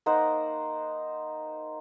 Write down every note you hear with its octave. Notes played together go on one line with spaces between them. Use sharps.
A#3 D#4 C5 F#5